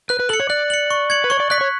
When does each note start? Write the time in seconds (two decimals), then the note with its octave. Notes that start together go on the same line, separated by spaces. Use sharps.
0.09 B4 F#6
0.20 B4
0.29 A4 C#7 F#7
0.40 C#5
0.50 D5 F#6
0.70 C#7 F#7
0.91 C#6
1.10 G#6 C#7 F#7
1.24 B4
1.30 C#5 C#6
1.40 D5
1.50 D5 F#6 B6
1.61 C#5